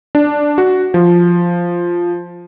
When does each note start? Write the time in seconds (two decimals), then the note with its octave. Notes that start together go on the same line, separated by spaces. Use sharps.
0.15 D4
0.58 F#4
0.94 F3